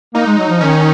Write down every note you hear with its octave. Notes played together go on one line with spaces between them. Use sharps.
A#3 D#4
G#3
F#3
F3
D#3 C#4